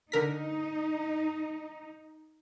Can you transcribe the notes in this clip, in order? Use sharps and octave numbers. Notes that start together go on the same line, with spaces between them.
D3 D#4 A#4 B6